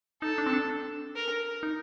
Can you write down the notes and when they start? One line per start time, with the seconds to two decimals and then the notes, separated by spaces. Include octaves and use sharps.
0.22 D#4 A4
0.38 D4
0.46 C4
0.53 D4
1.16 A#4
1.63 D#4